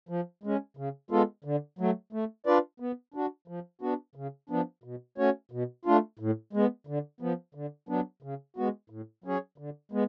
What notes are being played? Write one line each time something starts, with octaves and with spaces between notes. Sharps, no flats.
F3
G#3 C#4
C#3
G#3 B3 F4 A4
D3
F#3 A3
A3
D4 F4 B4 D5
B3
D4 F#4
F3
B3 D4 F#4
C#3
F3 B3 D4
B2
A3 C#4 F#4 C#5
B2
A3 D4 F4
A2
G#3 B3
D3
F3 B3
D3
F#3 B3 D4
C#3
G#3 B3 F#4
A2
F#3 C#4 G#4 C#5
D3
G#3 B3